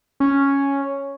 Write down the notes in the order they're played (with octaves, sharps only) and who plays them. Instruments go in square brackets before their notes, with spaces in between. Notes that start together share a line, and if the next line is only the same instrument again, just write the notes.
[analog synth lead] C#4